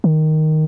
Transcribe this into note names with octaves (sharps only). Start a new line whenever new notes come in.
D#3